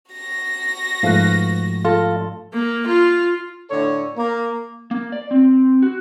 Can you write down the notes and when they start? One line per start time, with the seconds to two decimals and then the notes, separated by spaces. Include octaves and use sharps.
0.12 F#4 A#6
1.03 G#2 F3 A3 B4 F5
1.85 F4 A4
2.54 A#3
2.87 F4
3.69 A2 D3 A4 C#5
4.16 A#3
4.91 A#3
5.12 D5
5.31 C4
5.82 F#4